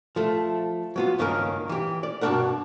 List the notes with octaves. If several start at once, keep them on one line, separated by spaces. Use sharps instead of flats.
F3 A3
F#3 B3 F4
C#2 G2 D#3 A#3 C#4 A#4
E3 G4
D5
G2 B2 G#3 D4 A#4 F#5